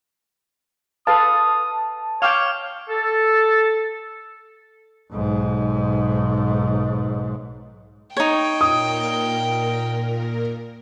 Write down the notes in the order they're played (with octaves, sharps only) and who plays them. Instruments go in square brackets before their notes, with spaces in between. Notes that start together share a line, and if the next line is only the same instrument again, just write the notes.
[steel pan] A4 B4 F5 [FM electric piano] A5 [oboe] D#6
[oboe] C#5 [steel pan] F5 G5 [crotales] D6 F6 F7
[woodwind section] A4
[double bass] B1 G#2
[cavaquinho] D#4 C#5 [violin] G5
[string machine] A#2 A#4 [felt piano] D#6